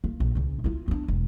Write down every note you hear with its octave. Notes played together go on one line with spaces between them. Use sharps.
A#3
A#1
C#2 C#3
E4 F4
B3 D4
E1